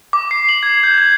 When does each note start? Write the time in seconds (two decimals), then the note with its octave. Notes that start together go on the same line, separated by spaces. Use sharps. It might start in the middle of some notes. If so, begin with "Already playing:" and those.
0.13 D6
0.31 C7
0.49 F#7
0.63 G#6
0.83 G6
0.98 G#6